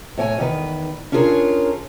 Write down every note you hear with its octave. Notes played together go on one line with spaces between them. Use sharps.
A2 C#5 G5 G#5
E2 D#3 B4
C#4 D4 F4 G#4 A#4 C#5